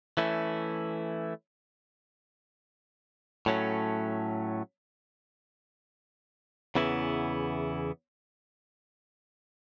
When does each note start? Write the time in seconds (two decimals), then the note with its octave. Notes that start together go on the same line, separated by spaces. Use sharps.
0.17 E3 A3 C#4 E4
3.46 A2 F#3 A3 C#4
6.75 E2 C#3 E3 B3 E4